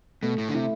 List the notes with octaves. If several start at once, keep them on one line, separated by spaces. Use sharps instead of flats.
B2 A3
A2
D3
C3 E4